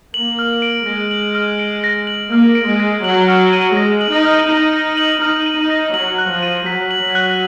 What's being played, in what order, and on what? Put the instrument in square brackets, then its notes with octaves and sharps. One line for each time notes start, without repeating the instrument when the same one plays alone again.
[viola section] A#3 [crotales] F#7
[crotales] F6
D7
[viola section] G#3 [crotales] A#6
[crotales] F#7
F6
D7
A#6
F#7
[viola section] A#3 [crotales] F6
[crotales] D7
[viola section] G#3
[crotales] A#6
[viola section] F#3 [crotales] F#7
[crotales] F6
D#7
[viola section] G#3 [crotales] A#6
[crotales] F#7
[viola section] D#4
[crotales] F6
[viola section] D#4 [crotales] D#7
[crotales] A#6
F#7
[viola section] D#4 [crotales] F6
[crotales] D#7
[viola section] D#4
[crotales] A#6
[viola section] F#3 [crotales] F#7
[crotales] F#6
[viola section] F3
[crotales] D#7
[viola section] F#3 [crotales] B6
[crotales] F#7
[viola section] F#3
[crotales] F#6